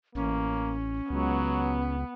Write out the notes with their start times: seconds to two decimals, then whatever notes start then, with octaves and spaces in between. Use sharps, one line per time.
0.15 A1 A#3 C#4
1.10 C#2 F#3 B3